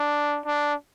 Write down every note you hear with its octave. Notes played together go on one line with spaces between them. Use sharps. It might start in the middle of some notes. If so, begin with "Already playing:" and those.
Already playing: D4
D4